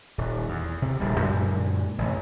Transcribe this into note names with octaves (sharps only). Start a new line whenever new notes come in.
D#1
E2
C3
D1 A#1 G3
F#2 A#2 D3 G#3
A1 C3